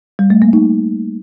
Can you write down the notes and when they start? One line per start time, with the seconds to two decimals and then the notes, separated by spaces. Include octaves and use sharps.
0.19 G3
0.30 A3
0.42 A#3
0.53 D#4